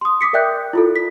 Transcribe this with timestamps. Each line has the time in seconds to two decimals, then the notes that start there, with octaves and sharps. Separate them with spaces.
0.01 C6 D#6
0.21 D6 D#6 B6 C#7
0.33 A#4 D5 E5 G5 F#6 G6
0.73 E4 F4 A4
0.96 B6